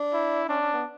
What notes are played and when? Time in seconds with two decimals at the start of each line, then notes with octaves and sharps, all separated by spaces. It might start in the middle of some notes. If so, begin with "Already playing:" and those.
Already playing: D4
0.13 E4
0.49 C#4 D4
0.61 C#4
0.73 B3